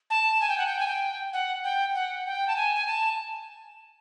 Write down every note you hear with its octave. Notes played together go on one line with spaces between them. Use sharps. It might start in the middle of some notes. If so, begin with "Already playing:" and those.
A5
G#5
G5
F#5
G5
G#5
G5
F#5
G5
F#5
G5
A5
G#5
G#5
A5